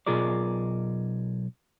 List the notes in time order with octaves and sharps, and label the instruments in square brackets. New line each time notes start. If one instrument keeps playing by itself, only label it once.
[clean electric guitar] B1 B2 F4 G#4 A#4 D5